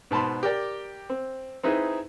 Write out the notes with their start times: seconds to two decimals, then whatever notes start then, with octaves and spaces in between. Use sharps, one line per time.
0.11 G#2 B2 A5 B5 C6
0.43 G4 A#4 D5 G5
1.10 C4
1.63 C4 D#4 E4 G#4 B4